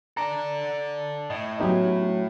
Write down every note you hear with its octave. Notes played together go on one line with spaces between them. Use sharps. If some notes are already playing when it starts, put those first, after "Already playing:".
A4 D5 A#5
A2 D#5
F#3 B3 C#4 D#4 G4